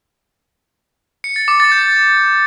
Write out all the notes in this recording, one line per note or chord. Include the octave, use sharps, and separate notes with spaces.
C#7
A6
D6
A6
G6